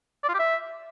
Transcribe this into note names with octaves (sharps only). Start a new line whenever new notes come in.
D5
F4
G4
E5